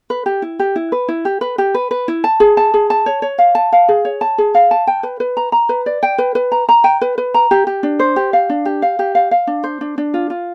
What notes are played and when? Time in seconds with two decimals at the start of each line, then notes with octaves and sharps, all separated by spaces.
0.10 B4
0.26 G4
0.42 E4
0.59 G4
0.76 E4
0.92 B4
1.08 E4
1.25 G4
1.41 B4
1.58 G4
1.74 B4
1.91 B4
2.08 E4
2.24 A5
2.40 G#4
2.57 A5
2.74 G#4
2.90 A5
3.06 C#5
3.22 C#5
3.38 F5
3.55 A5
3.72 F5
3.89 G#4
4.05 C#5
4.21 A5
4.38 G#4
4.55 F5
4.71 A5
4.87 G5
5.03 B4
5.20 B4
5.37 A#5
5.52 A#5
5.69 B4
5.86 D5
6.03 G5
6.18 B4
6.35 B4
6.52 A#5
6.69 A#5
6.84 G5
7.01 B4
7.18 B4
7.34 A#5
7.51 G4
7.67 G4
7.83 D4
7.99 C5
8.16 G4
8.33 F5
8.50 D4
8.65 G4
8.82 F5
8.99 G4
9.15 F5
9.31 F5
9.47 D4
9.64 C5
9.81 D4
9.98 D4
10.14 F4
10.30 F4